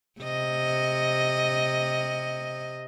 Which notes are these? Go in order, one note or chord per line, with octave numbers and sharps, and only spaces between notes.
C3 D#5